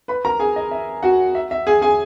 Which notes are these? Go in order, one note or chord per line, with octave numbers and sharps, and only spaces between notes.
B4 B5
A#4 A#5
G#4 G#5
D#5
E5
F#4 F#5
E5
E5
G#4 G#5
G#4 G#5